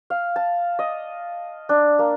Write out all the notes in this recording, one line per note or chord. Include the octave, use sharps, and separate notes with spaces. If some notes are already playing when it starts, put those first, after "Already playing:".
F5
A5
D#5
D4
A#3